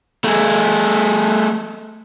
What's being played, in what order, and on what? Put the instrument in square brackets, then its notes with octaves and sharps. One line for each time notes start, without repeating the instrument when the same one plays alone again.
[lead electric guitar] A3 G#4